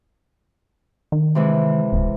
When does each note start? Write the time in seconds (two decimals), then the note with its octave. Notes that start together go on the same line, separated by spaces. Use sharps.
1.12 D#3
1.35 C3 E3 G#3
1.93 D1